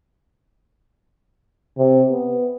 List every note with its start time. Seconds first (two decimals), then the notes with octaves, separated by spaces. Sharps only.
1.78 C3
2.10 B3